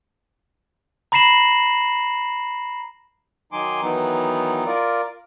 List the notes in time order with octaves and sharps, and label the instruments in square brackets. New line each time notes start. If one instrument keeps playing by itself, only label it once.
[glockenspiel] A#5 B5 A#6 C7 E7 F#7
[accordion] D#3 F#3 D#4 G#5 C6 D6
D#3 E3 F#3 B3 D#4
F4 A#4 D5